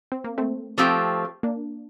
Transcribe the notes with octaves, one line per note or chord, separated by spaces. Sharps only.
C4
A#3
A3 C4
F3 A3 C4 G4
A#3 D4